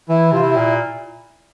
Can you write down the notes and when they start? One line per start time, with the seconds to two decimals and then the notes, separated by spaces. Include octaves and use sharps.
0.09 E3 E4
0.32 C3 F4
0.41 E4
0.56 A#2